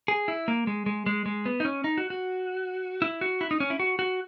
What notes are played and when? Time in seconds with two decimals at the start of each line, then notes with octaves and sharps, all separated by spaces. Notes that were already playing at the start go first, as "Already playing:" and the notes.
0.08 G#4
0.28 E4
0.48 A#3
0.67 G#3
0.86 G#3
1.06 G#3
1.26 G#3
1.46 B3
1.60 D#4
1.65 C#4
1.84 D#4
1.98 F#4
2.10 F#4
3.02 E4
3.21 F#4
3.41 E4
3.51 D#4
3.60 C#4
3.70 E4
3.80 F#4
3.99 F#4